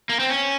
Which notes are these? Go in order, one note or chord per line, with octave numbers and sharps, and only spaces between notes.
A#3
C4
C#4